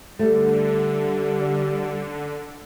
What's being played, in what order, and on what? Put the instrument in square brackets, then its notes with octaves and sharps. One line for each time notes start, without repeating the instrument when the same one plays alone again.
[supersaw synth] D3 [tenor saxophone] G3 [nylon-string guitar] A3